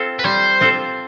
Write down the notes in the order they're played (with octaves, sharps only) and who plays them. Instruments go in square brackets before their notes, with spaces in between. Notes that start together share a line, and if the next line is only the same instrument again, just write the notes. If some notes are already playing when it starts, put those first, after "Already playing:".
Already playing: [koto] C4 F4 A4
[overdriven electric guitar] B4
[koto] G3 [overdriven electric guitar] C5
[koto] C4 F4 A4